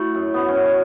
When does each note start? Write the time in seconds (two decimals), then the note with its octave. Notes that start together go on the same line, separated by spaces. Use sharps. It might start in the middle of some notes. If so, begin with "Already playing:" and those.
Already playing: A3 E4 F#4
0.15 F#2
0.34 D3 B3
0.48 C#4
0.55 F#2
0.62 C#4